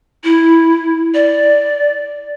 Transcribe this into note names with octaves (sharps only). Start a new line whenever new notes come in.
E4
D5